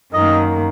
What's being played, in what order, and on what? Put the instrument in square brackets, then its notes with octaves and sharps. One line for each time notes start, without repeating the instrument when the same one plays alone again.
[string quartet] F#2 D#3 A#3 [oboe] D#5